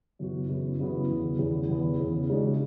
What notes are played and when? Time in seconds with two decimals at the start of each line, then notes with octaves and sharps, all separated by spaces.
0.19 F#2 C#3 E3 B3 F#4
0.49 F#2 C#3 E3 B3 F#4
0.79 F#2 C#3 E3 B3 F#4
1.09 E2 C#3 E3 B3
1.39 E2 C#3 E3 B3
1.69 E2 C#3 E3 B3
1.99 E2 C#3 E3 B3
2.29 C#2 C#3 G#3 D4 F#4